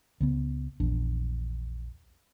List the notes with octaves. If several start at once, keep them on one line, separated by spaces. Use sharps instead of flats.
C#2 C#3 B3
A#1 E2 D4